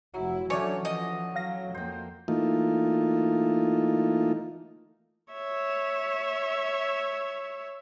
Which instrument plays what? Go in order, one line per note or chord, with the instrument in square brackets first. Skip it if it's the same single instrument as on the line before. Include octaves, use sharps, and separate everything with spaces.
[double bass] F1 E4 [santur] F#3
[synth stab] D3 D5 G#5 [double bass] E3 F#3 [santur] A3 C#4 [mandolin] C#5
[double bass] E3 F3 [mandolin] D#5
[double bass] F#3 [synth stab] F5 A#6
[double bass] F2 A#3 [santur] C5 G5
[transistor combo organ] E3 A3 A#3 D#4 F4
[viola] C#5 E5